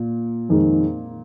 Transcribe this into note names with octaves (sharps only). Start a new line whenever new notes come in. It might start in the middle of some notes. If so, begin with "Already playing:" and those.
Already playing: A#2
F2 D#3 G#3